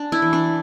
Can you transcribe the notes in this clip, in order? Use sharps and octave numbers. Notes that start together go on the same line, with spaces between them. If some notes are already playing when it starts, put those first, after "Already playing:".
Already playing: D4
E4
E3
D4